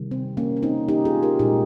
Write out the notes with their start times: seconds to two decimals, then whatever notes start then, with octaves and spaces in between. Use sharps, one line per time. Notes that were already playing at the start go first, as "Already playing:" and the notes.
Already playing: C3 D#3 G3
0.11 C4
0.37 A#3 C#4
0.57 C#4
0.62 C4 D#4
0.88 D#4 G4
1.05 F4 G#4
1.23 G4 A#4
1.39 A#2 G#3 D#4 G4